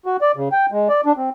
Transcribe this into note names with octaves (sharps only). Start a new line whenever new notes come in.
F#4
D5
C#3
G5
G#3
D5
D4
C4